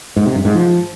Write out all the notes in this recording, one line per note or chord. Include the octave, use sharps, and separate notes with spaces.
G#2
C3
G2
G#2
F3